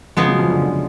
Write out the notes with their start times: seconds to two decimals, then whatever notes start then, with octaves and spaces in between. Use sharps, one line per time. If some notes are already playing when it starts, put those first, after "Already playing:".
0.17 C#3 F3 G#3 B3
0.28 F#3
0.39 F3
0.50 D3
0.62 D3